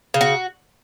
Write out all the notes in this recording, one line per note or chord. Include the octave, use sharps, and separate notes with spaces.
C#3
F#4